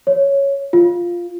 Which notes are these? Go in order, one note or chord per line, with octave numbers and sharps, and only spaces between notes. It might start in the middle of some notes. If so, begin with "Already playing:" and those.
C#5
F4